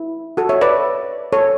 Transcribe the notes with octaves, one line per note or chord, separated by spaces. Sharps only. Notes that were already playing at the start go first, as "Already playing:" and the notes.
Already playing: E4
F#4 A4
C#5 E5
B4 D5
A4 C#5